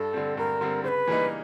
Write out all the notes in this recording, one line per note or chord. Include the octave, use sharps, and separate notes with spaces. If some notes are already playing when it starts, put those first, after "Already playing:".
Already playing: G2 A4
D3 G3 C4
G2 A#4
D3 G3 C4
C#3 B4 C5
E3 G3 A#3 D#4